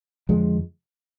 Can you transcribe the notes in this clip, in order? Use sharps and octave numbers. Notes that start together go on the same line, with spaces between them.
F2 D3 F3 G#3